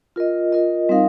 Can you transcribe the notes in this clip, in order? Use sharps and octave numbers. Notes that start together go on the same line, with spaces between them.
F4 A#4 D#5
F4 A#4 D#5
G3 C4 D#4 A#4 F5